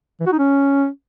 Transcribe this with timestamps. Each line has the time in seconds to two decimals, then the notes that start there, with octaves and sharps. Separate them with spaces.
0.20 E3
0.27 F#4
0.33 D#4
0.39 C#4